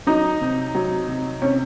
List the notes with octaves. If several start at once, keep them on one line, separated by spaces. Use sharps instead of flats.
F#3 D#4
C3
F#3
C3
C3 C#4